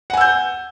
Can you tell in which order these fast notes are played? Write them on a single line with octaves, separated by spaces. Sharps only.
F#5 G#5 E6 G6